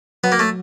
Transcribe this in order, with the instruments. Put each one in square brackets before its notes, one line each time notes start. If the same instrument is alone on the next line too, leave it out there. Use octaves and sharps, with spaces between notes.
[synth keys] F#3 [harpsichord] B3
[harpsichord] A#3
A3